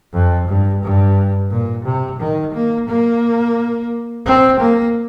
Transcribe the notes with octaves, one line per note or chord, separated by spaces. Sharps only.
F2
G2
G2
A#2
C3
D#3
A#3
A#3
C4
A#3